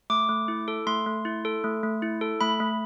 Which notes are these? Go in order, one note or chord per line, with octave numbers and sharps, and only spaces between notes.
A3 D6
A3
E4
A4
A3 C6
A3
E4
A4
A3
A3
E4
A4
A3 B5
A3